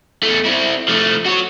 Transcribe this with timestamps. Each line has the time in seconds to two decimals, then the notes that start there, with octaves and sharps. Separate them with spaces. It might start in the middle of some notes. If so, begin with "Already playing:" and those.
0.23 E2 A3
0.45 C4 E4
0.88 F3 A3
1.26 F#4 C#5